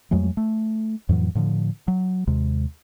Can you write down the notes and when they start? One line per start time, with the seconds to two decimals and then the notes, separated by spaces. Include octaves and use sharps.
0.11 F2 F#3 G#3 A3
0.37 A3
1.09 F2 A2 E3 F#3
1.35 A2 D3 F3
1.88 F#3
2.28 D#2 C3 G#3